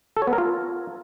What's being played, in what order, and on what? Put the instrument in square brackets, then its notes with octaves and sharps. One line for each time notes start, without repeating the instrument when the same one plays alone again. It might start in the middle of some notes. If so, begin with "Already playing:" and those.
[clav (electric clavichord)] A4
C#5
B3
A#4
F4